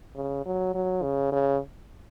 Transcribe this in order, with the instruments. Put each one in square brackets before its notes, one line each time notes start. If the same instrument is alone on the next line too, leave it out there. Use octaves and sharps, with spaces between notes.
[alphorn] C#3
F#3
F#3
C#3
C#3